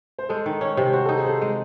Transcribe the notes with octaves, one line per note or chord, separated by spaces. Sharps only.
C5
G#3 A4
D#3
C#4
C3
F#4 C5
D#4 A4
G#4
A4 C5
G#3